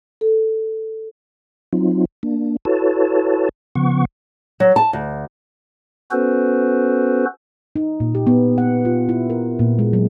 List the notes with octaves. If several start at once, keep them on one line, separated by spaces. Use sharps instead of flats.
A4
F#3 C4 D#4 F4
A#3 D4
E4 F#4 A4 B4 C#5 A5
C#3 F3 B3 F#5 C#6
F#3
A5
D2
B3 C#4 F#4 A4 B4 C5
D#4
A#2
G4
B3
F#5
F4
E4
A#4
A#2
G#3
F#3